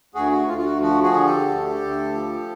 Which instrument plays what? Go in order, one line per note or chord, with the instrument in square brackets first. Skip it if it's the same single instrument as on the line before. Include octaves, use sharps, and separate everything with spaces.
[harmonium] D2 F#4 G#4
F#4
D2 F4
F4
F#4
F3 F#4
F#4 G#4
D3
G4 A4
D2
D2
F3